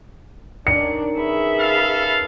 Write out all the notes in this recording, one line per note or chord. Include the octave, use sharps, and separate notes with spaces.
D#3 C#4 D4 C#7
G#4 B4 E5 B5
A4 F5